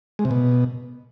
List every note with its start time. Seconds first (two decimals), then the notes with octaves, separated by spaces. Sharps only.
0.19 G#3
0.25 C3
0.31 B2